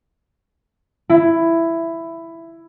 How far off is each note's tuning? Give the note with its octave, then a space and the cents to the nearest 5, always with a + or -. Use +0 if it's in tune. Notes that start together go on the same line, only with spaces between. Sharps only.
E4 +10